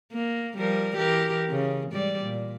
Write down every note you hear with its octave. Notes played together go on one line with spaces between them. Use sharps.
A#3
F3 G3 A#4
E3 G4 A#4
C#3
G#2 G3 D5
A#2